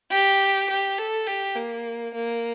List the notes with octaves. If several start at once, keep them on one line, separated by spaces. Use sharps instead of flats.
G4
G4
A4
G4
A#3
A#3